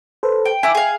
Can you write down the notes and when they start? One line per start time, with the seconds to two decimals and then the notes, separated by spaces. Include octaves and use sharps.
0.23 A4 B4 C5
0.45 G5
0.63 E4 E5 G5 G#5 D6
0.75 G#4 F5